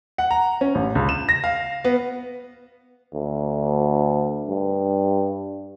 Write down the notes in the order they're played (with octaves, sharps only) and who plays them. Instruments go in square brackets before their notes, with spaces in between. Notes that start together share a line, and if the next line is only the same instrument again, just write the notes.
[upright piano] F#5
A#5
C#4
A1
C#2
E7
A#6
F5
B3
[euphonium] D2
G2